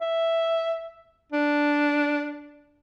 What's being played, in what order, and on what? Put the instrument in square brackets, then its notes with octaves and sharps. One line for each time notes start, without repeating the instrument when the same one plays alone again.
[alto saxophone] E5
D4